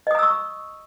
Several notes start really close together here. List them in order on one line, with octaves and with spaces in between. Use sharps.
D#5 D#6 A#5 E6 C#6